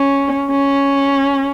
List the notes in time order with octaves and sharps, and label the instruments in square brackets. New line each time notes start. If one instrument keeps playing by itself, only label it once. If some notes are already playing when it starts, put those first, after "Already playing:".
Already playing: [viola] C#4
C#4